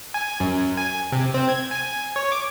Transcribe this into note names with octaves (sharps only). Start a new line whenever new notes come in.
G#5
F#2
G#5
C3
C4
G#6
G#5
C#5
D6